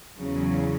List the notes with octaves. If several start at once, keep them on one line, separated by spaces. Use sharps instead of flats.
E2 C#3 F#3